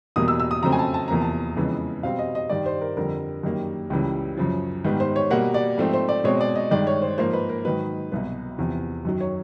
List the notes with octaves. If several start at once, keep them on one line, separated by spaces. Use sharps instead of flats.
E2 B2 G3 A#3 D#6
E6
E6
D#6
F2 C#3 F#3 A3 C4 A#5
G#5
A5
A5
E2 C3 F3 A#3 A#5
A5
F2 C#3 E3 G#3 B3
B2 G3 C4 F5
D#5
D#5
G2 D#3 G3 D5
C5
A#4
F2 D3 G3 A#4
F#2 D#3 G3 A#3
C#2 C#3 E3 G3
F#2 C#3 F3
G#2 D#3 G3 B3
C5
C#5
B2 G3 A#3 F#5
D5
G#2 F3 A3 C4
C5
D5
B2 G#3 C4 C#5
D5
D#5
G2 D#3 G#3 D5
C#5
C5
G#2 F3 A#3 C5
B4
A#4
G#2 D#3 F#3 B4
C2 B2 F#3 B3
E2 C3 F3
F#2 D#3 F#3
C#5